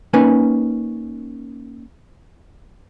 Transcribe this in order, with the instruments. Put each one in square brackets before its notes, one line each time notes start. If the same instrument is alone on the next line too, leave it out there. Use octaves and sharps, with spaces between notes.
[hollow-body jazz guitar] A#3 C#4 D#4 B4 G#5